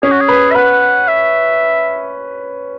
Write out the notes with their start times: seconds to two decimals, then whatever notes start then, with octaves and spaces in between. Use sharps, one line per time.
0.03 C#4 G#4
0.11 F#4
0.20 G#4
0.28 B4
0.52 E5
0.55 B4 F#5
1.08 E5